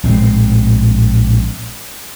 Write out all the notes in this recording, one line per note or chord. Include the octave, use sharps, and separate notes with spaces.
A#1 A2 G#3 C4